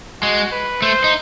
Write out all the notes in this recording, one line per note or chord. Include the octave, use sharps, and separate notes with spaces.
G#3 F#4
B4
A3 C5
D#4